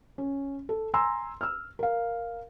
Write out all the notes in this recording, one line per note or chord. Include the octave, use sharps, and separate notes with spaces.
C#4
A4
G#5 A#5 C6 E6
E6 F6
A#4 F5